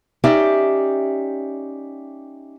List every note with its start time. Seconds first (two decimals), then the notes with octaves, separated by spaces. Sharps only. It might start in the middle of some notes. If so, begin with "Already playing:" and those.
0.24 C#4 D#4 G4 D5 E5